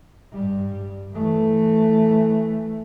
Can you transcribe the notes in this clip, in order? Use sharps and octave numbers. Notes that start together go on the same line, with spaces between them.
G2 G3
E3 A3